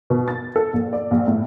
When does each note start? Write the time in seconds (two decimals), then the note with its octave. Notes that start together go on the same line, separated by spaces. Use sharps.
0.10 B2
0.28 A6
0.56 A4
0.73 A#1
0.93 D5
1.11 A#1
1.28 A2